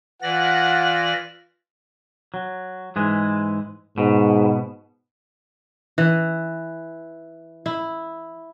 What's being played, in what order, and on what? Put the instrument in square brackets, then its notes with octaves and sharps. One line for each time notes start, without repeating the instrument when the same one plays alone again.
[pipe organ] E3 D5 A#6 [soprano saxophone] F4 [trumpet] F#5
[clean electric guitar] F#3
G#2 E3 G#3
[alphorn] G#2 [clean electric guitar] B2
[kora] E3
E4